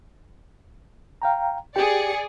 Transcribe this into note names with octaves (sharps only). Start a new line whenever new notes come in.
F5 G5 A#5
G4 G#4 D5 G5 C#7